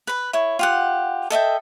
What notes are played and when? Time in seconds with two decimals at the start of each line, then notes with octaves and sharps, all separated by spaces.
0.07 B4 B5
0.33 E4 C#5
0.59 F4 G4 F#5
1.30 A4 D#5 E5 G5